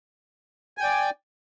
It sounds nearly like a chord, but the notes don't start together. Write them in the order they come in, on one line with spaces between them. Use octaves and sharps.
G#5 G5 D5